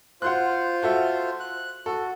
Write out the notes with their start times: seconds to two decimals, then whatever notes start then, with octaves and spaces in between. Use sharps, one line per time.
0.22 F4 C5 F#5 C6 F#6
0.82 F#4 A4 E5
1.40 F#6
1.86 F#4 A4